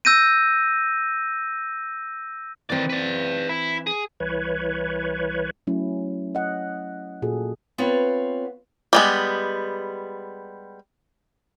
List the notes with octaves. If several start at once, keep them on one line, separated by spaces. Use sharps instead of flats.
E6 G6 A#6 D#7
D#3 E3 C4 D5
B4 D5
E4
G#4
C2 E3 B4 C#5
F#3 A3 C#4 E4
D#5 F#5
A#2 F#4 G#4 A4
B3 C4 F4 B4 C#5 F5
G3 G#3 B3